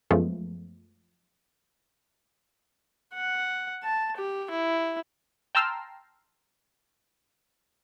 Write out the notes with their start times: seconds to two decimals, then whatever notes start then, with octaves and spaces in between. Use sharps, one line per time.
0.11 F#2 F3 G#3 A3 B3
3.14 F#5
3.83 A5
4.17 G4
4.50 E4
5.55 G5 A5 A#5 C6 E6 F6